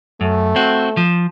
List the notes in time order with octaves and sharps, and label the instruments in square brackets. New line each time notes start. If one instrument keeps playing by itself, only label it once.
[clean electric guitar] F#2 [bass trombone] A3
[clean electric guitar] C4 F#4
F3